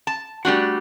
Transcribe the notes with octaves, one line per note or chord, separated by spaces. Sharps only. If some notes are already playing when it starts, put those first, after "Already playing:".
A5
G3 A3 D4 F#4